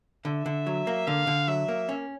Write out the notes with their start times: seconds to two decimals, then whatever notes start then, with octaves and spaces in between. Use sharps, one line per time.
0.25 D3 E5
0.46 D3
0.67 F#3
0.87 A#3
1.07 D3 F5
1.27 D3
1.48 F#3 E5
1.69 A#3
1.89 C#4